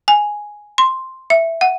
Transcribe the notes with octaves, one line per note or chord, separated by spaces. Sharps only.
G#5
C6
E5
F#5